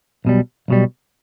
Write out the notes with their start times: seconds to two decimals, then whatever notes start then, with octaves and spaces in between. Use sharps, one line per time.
0.25 B1 B2 G3
0.68 B1 B2 G3